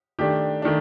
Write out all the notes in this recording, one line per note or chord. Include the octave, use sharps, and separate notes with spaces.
D#3 A3 D4 G4
D#3 A3 D4